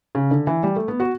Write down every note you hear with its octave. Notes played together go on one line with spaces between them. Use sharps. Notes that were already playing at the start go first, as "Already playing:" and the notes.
C#3
D3
E3
G3
A3
B3
F#4